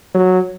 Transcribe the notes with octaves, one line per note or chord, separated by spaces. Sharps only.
F#3